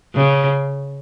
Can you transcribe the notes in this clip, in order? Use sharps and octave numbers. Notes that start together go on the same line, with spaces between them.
C#3